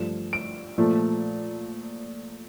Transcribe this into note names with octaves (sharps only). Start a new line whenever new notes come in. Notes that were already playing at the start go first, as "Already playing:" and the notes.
Already playing: G2 F3 A3 E7
D7
A#2 F3 A3